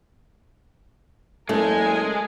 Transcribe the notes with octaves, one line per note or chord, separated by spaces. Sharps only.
F#1 G#3 A3 A#4 G#5